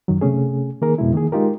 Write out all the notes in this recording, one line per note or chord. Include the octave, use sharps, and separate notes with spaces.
F#2 D#3 F#3
C3 A3 C#4 G#4
D#3 A#3 G#4 A#4
F2 B2 G#3 E4
D#3 A#3 G#4
G#3 D#4 F4 G4 A#4